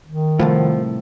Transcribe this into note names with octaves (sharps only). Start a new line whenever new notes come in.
D#3
C2 F#2 A2 F3